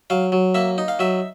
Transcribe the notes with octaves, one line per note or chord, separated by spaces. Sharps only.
F#3 F5
F#3
A#3 E5
D#4
F5
F#3 E5